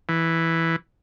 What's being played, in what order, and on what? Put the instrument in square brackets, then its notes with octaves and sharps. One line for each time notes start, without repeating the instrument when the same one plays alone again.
[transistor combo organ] E3